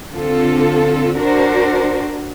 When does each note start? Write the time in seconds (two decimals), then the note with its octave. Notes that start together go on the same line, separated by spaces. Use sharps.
0.11 D3 C4 F4 A4
1.18 D4 F#4 A#4 C5